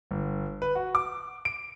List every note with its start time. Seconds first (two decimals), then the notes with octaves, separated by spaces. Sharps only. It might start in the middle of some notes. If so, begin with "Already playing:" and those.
0.11 G1
0.62 B4
0.75 F#4
0.95 D6
1.45 D7